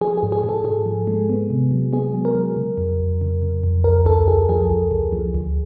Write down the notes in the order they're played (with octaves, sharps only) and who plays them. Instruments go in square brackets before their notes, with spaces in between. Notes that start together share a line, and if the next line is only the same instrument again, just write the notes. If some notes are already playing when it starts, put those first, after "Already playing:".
[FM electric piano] F3 G#4
G#4
G#2
G#4
G#2
A4
G#2 G#4
F3
G#3
B3
C3
F#3
B3 G#4
F#3
A#4
F#3
C#3
F2
F2
C#3
C#3
F2
C#2 A#4
C#2 A4
C#2 G#4
F3 G#4
C#2
C#2
F3
D2